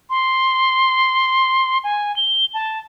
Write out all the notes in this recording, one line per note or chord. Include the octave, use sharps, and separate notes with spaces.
C6
G#5
G7
A5